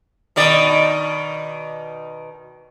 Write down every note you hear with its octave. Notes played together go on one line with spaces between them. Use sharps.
B2 D#3 D5